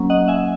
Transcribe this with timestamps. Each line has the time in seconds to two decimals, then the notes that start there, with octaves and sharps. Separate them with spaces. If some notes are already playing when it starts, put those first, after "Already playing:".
Already playing: F#3 A#3 C#4
0.10 D#5 F#5
0.28 E5 G#5